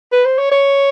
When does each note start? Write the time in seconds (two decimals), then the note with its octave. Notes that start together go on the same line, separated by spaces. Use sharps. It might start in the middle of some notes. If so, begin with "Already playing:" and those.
0.12 B4
0.25 C5
0.38 C#5
0.51 C#5